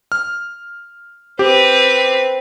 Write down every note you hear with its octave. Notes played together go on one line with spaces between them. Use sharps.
F6
C4 G4 B4